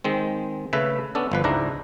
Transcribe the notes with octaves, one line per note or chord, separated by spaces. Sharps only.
D#3 G#3 C4
C#3 A3 B4 E5
B3 C#4 D4 A4
G1 F3 B4
C#2 G#2 D4 E4 A#5